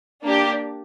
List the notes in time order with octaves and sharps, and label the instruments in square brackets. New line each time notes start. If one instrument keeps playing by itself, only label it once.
[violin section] A#3 D4 G4